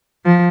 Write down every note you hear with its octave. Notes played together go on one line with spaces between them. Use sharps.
F3